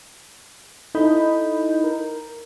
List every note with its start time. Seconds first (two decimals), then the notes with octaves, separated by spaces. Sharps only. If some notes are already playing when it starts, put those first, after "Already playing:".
0.95 D#4 E4 A4 D#5 B5 G6
1.84 A#4